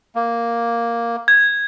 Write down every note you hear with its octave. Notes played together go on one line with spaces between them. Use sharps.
A#3
G#6